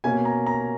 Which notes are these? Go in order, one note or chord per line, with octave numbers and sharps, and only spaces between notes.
B2 A#3 C#4 G#5
A#5
A#5